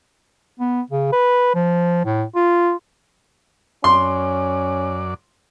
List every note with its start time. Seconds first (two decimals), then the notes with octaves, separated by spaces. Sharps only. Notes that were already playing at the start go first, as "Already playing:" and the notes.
0.60 B3
0.91 C#3
1.13 B4
1.55 F3
2.05 A2
2.35 F4
3.84 F#2 C#4 D5 C6